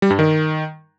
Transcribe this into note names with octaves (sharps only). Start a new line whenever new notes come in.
G3
G2
D#3